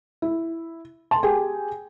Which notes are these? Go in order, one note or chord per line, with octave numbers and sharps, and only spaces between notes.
E4
A5 C6
G4 G#4 G5 G#5